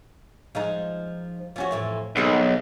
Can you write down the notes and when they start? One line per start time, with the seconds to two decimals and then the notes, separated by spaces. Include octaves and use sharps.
0.55 F3 G#3 D#4
1.56 F3 C#4 F#4
1.71 F2 A2 E3
2.16 B1 D#3 C4 G#4